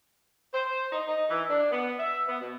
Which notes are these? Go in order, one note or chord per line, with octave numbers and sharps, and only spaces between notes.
C5
D#4
D#4
E3
D4
B3
E5
B3
B2